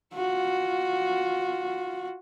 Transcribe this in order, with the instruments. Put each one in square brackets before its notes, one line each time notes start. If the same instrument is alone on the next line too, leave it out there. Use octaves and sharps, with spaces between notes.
[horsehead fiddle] F4 F#4